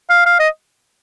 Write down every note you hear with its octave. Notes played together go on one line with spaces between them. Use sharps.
F5
F5
D#5